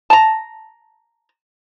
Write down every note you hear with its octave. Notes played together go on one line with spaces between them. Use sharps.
A5 A#5